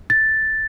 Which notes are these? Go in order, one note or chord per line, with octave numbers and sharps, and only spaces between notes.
A6